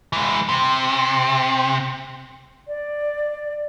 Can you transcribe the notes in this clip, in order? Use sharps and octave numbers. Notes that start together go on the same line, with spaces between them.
E3 G#3
C3
D5